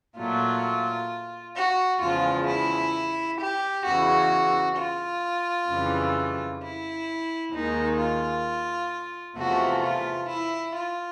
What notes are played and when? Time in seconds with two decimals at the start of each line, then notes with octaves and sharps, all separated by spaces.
0.18 A#2 F#3 A3 F4
1.57 F#4
2.02 E2 C#3 F3 G#3 F4
2.48 E4
3.40 G4
3.86 E2 C#3 E3 F#4
4.78 F4
5.70 F2 C#3 E3 G3
6.62 E4
7.54 D#2 D#3 G#3 D#4
7.99 F4
9.38 E2 C3 F3 A3 F#4
9.84 F4
10.29 E4
10.76 F4